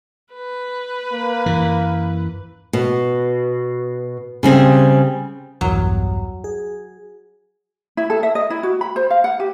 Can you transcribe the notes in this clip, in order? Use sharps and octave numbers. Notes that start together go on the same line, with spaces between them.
B4
A#3
F#2 E3
B2
C#3 G3 C4 G#4
B1 E2 G2 F#3
G#4
E4
A4
E5
D#5
E4
F#4
B5
C5
F5
F#5
G4